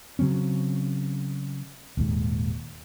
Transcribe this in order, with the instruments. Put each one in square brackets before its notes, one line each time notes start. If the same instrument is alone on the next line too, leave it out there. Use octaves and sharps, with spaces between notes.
[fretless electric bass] C#3 F#3 C4 C#4
D#1 D#2 G#2